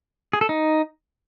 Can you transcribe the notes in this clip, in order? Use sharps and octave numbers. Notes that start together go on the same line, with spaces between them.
G#4
A4
D#4